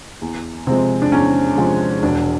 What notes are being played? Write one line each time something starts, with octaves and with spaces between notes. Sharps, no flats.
E2
C3 F3 G#3 C4
D4
E2 C#4
C3 F3 G#3
E1 D4